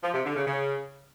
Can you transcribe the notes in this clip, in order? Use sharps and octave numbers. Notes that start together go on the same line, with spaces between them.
F3
C3
D3
C#3
C#3